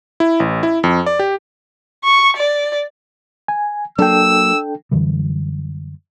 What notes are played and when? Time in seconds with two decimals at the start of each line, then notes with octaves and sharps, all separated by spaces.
0.20 E4
0.40 A1
0.63 E4
0.84 F2
1.06 D5
1.19 G4
2.04 C#6
2.36 D5
3.48 G#5
3.98 F#3 A#3 D4 A4 G5 E6
4.91 F#2 D3 E3 G3